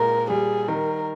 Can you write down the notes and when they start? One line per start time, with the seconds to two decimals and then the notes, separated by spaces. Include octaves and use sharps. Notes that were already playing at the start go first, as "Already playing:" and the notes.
Already playing: A#2 G#3 A#4
0.30 G3 G#4
0.68 D#3 A#4